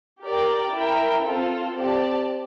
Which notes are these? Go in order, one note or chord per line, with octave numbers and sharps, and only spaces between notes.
G4 A#4 D5 G5
E4 A#4 E5 G5
C4 F4 A4 C5
C4 G4 D5 A5